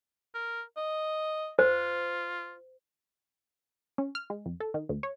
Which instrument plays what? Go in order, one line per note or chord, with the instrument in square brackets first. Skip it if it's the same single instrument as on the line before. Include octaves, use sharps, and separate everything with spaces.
[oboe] A#4
D#5
[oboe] F4 [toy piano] C5
[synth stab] C#4
F6
G#3
F2
A4
D#3
D2
C#5